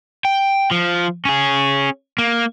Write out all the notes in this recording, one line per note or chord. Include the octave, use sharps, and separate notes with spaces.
G5
F3
C#4 G#4
A#3